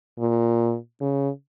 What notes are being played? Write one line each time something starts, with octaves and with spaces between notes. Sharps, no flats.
A#2
C#3